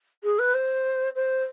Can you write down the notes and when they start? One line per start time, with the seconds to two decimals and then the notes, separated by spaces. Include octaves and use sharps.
0.23 G#4
0.39 B4
0.54 C5
1.15 C5